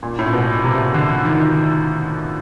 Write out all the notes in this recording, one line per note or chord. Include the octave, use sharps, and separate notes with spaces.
A#2
A2
A#2
B2
C3
D3
D#3